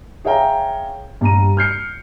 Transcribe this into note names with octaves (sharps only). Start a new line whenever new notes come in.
G#4 C#5 E5 F5 G5 A#5
G2 G4 A#5 D#7
F6 G6 C7 C#7